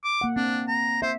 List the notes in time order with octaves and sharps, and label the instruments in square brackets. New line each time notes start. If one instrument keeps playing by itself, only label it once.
[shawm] D6
[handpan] A#3 F#5
[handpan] C4 [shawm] D4
[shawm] A#5
[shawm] C5 [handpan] E5